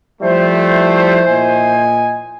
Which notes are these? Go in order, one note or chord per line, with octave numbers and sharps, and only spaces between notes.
F3 G3 A3 E4 C5
A#2 D#5 G#5